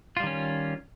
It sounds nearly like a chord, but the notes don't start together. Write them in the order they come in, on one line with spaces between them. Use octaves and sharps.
F4 G3 D#3 C#4